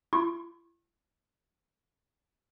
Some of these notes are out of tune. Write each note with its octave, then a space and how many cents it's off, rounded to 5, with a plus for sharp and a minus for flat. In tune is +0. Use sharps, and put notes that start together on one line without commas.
E4 +45 C#6 -35